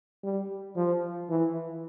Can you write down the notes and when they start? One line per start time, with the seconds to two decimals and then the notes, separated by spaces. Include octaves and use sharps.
0.23 G3
0.76 F3
1.29 E3